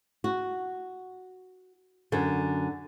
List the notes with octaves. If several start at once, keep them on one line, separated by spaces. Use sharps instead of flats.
F#4
F#2 D3